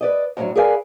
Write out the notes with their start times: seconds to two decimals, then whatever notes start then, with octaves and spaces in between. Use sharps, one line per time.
0.01 B4 D5 D#5
0.37 F2 A2 D#3 F#3 D4
0.55 G#4 A#4 B4 D5 F5 G#5